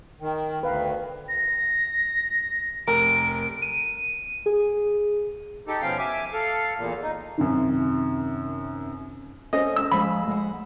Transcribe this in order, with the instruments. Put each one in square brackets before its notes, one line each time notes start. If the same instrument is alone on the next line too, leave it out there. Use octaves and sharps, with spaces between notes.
[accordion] D#3 [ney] G5
[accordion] D2 [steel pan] B4 F5 A#5
[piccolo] A#6
[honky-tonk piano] F1 A#4 [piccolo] D7
[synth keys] D#7
G#4
[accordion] D#4 G4 A4
B2 F3 C#4 F5 G5
E5 G#5 D6
A4 F5
E2 A#2
D#4
[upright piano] F#2 C3 D#3
[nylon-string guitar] C#4 A4 C5 [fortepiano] D#5
[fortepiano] E6
[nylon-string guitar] F3 G#3 [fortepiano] B5
[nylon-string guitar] G#3 F#5